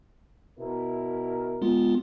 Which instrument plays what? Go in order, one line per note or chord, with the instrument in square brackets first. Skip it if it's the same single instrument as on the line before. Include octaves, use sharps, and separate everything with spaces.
[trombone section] B2 E4 A#4
[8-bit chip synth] G#3 B3 F4